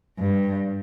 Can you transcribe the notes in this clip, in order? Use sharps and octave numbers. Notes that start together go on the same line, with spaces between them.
G2